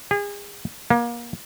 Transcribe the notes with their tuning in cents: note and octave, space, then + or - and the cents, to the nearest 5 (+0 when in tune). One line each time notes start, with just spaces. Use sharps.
G#4 -35
A#3 +25